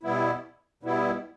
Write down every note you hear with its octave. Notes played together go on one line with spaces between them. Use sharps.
B2 G3 B3 E4
B2 G3 B3 E4